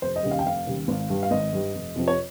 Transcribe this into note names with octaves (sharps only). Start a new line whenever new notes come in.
F1 C5
D#5
D#2 C#3 G3
F5
G5
F1 F5
D#2 C#3 G3
G#1
G2 G3
F5
G#1 D#5
G2 G3
F1
F2 C3 F3 C4
C#5